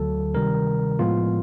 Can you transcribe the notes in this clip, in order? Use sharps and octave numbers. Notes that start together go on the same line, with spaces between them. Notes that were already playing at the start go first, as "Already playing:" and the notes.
Already playing: D2 D3 F#3 A4
C3 D#3 G3 A#4
A2 F3 G#3 B3 F4